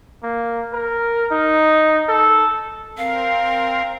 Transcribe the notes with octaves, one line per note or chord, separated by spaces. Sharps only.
A#3
A#4
D#4
A4
C4 A#4 F5